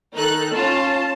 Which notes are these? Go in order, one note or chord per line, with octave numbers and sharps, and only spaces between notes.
D#3 D#4 A4 F#6
C#4 F4 A5